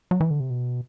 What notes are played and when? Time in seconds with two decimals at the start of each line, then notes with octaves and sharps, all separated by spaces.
0.11 F#3
0.21 E3
0.31 D3
0.40 C3
0.50 B2